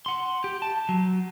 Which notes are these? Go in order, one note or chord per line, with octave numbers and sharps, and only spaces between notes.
F#5 C6
G4
A5
F#3